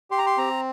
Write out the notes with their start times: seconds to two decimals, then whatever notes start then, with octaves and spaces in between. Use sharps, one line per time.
0.11 G4 C6
0.18 A#5
0.26 C6
0.38 C4 A#5